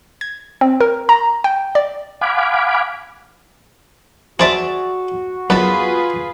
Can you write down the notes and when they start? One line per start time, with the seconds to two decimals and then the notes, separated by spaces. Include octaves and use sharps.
0.21 G#6
0.61 C4
0.81 A#4
1.09 A#5
1.44 G5
1.75 D5
2.21 F5 F#5 G#5 B5 D6
4.39 D4 F#4 G#4 C5 D5 E5 A5
5.50 F#2 B3 F4 G#4 B4 A5